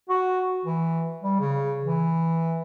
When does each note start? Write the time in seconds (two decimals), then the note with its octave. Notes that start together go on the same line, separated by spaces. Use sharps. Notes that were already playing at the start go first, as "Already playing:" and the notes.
0.09 F#4
0.65 E3
1.23 G3
1.40 C#3
1.85 E3